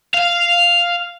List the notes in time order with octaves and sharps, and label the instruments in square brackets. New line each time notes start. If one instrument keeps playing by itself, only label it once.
[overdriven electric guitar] F5